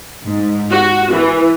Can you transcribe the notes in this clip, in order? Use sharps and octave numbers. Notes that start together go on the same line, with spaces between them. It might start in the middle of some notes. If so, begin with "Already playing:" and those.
G#2
F#4
E3